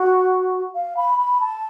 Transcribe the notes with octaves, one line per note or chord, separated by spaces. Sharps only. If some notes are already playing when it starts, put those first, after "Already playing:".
Already playing: F#4
F5
B5
B5
A5